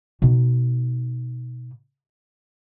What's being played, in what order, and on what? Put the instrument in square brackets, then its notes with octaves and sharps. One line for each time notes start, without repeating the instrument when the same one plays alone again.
[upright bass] B2 D#4